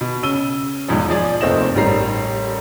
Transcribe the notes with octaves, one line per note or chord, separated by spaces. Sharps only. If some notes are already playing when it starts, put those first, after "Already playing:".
B2
C#3 E6 D#7 G7
B1 E2 G#2 F3
F3 G#4 D5
F1 D#2 A3 C4 D#5 E7
A1 D#3 G3 A#5 C7